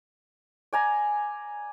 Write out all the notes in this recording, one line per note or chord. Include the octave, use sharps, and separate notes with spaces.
D5 G#5 A#5